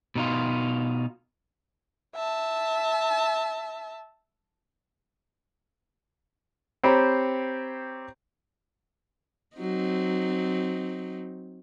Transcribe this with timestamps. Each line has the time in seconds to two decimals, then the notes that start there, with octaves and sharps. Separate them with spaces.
0.16 B2 D#4 F4
2.16 E5 A5
6.84 C4 G4 C5 C#5 A#5 B5
9.57 F#3 C4 D#4